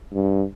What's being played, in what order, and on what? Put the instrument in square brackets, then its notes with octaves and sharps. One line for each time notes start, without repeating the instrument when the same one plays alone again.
[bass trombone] G2